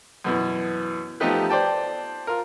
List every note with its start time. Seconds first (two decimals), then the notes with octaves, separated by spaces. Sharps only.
0.24 F#2 B2 E3
1.20 F3 A3 B3 D#4 G4 B4
1.49 C5 D5 G5 A5
2.27 F4 A#4